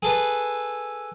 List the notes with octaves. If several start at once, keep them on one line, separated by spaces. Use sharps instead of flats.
G#4 A4 B4